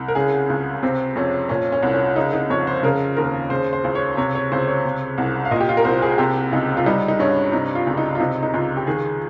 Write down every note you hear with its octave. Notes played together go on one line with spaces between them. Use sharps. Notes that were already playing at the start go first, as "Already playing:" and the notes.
Already playing: C2
A#4
C#3 G#4
C#2
C3 C4
F2 C#4
A#2 C#4
C#4
C2
C#4
C#3 D#4
D#4
F2 C#5
C5
C#3 A#4
D#2 A#4
C#3 C5
C5
C#2
C#5
C3 C#5
C#5
C#2 C5
C#5
C3
C2
F5
A#2 D#5
G4
F4
A#4
C2 C5
G#4
C3 G4
C#2 D#4
F4
G3 D#4
D#4
G2 C#4
C3 D#4
F4
C#2
D#4
F4
C3 D#4
D#4
C#2 F4
G4
D#3 G#4